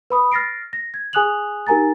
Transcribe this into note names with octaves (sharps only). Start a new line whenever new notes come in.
B4 B5 D#6
F6 A6 A#6 C7 D7
A#6
G#6
G#4 G#5 D#6 F#6 F7 F#7
D#4 G4 A#4 G#5 A#5 A6